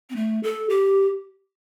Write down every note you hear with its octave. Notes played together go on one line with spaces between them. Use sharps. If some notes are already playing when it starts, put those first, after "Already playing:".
C4
A3
A4
G4